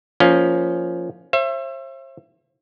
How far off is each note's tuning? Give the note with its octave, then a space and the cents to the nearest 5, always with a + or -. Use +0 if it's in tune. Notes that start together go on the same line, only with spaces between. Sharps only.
F3 +0 A#3 +0 C#4 +15
C5 +40 E5 +30